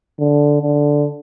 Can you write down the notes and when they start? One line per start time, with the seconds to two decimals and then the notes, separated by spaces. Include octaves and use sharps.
0.19 D3
0.62 D3